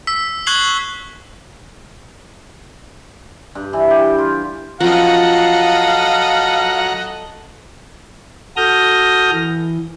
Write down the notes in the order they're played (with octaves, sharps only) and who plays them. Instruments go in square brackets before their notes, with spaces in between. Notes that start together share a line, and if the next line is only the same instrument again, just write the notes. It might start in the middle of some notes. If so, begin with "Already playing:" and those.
[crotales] E6 B6
C#6 F#6 G#6 C7 F#7 G7
[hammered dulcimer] G2
E3
G4
F4
[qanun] F3 C#4 [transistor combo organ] F#3 F#5 A#5 [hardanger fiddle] A4 D#5 [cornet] F5
[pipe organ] F#4 A4 D#6 F6 G6 A#6
E3